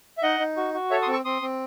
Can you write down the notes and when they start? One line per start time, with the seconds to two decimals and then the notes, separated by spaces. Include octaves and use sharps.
0.18 E5
0.23 D#4 D#5 F#5
0.40 D#4
0.57 F#4
0.74 F#4
0.91 A4 C#5 E5
1.02 C6 D#6
1.07 C4
1.13 C#6 E6
1.25 C4 C6 D#6
1.42 C4